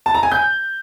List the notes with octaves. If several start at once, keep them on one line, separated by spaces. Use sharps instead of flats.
A5
A#5
G#5
G6